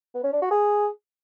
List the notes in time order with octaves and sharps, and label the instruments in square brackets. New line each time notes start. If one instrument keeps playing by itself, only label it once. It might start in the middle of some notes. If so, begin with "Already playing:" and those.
[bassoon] B3
C#4
D4
F#4
G#4